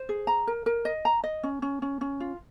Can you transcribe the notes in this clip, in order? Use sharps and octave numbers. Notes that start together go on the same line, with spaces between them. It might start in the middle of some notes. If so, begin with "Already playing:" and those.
Already playing: C5
G#4
A#5
A#4
A#4
D#5
A#5
D#5
C#4
C#4
C#4
C#4
F4